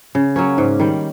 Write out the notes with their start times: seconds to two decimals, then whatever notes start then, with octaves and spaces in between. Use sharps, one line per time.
0.15 C#3
0.36 F#3 A#3 C#4
0.58 G#2
0.80 D#3 G3